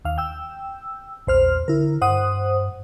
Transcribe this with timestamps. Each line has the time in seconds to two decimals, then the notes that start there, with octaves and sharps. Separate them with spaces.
0.05 D#2 F5
0.18 G5 E6
1.27 A#1 E2 C5 F6
1.68 D3 E4 A#4
2.01 G2 C5 F#5 D#6